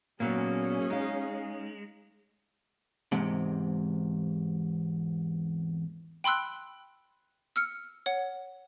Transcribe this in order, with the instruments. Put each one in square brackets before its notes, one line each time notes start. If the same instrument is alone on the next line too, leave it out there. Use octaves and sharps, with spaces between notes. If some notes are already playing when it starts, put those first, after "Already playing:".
[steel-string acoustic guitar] A#2 B3 D5 [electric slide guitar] F#3 A#3 [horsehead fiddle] C#4 G#4
[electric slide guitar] G#3 [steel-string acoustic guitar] D#4 F5
[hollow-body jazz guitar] E2 G#2 C3
[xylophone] G5 B5 C6 E6 F#6
E6 F6 C#7
C#5 F#5